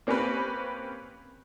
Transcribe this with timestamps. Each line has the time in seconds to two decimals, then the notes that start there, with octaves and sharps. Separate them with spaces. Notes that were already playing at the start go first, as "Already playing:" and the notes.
0.07 A#3 C4 C#4 G4 B4